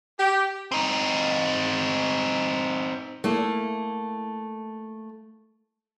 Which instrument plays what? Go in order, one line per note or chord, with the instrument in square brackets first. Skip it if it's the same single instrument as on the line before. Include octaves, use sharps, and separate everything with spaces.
[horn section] G4
[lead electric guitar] C4 D#4
[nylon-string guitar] A3 A#3 E4